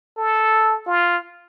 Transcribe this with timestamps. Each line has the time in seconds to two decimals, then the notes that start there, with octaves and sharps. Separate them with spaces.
0.17 A4
0.87 F4